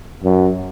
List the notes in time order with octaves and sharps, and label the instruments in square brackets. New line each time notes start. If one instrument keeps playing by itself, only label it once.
[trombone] F#2